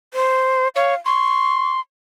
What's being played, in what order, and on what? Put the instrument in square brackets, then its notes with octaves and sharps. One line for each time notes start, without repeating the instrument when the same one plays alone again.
[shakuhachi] C5
[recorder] C#5 [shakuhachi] F5
[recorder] C6 [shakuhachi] C#6